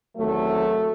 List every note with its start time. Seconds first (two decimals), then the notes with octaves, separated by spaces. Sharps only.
0.17 E2 C3 D#3 F#3 A3